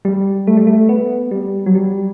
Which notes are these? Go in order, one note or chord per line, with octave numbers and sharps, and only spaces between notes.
G3
A3
G3
A3
B3
G3
F#3
G3